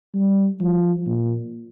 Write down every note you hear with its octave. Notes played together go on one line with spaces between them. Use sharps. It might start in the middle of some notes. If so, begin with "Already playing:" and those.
G3
F3
A#2